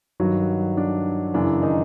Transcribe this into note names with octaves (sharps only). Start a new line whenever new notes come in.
G2 D#3 F#3 F#4
D4
F#2 C#3 E3 D4
D#3 D#4